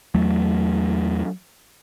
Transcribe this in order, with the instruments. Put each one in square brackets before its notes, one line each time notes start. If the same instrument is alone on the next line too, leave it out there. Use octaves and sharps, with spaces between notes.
[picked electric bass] E2 F#3 A3